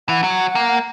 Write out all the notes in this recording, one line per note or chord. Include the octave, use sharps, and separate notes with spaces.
E3 F#5
F#3
A#3